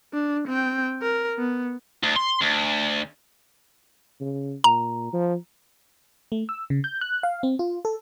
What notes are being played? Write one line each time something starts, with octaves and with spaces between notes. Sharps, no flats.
D4
C4 G5
A#4
B3
D2
C6
D2
C#3
A#2 A#5
F3
A3
E6
C#3
G6
F#6
F5
C4
F4
A4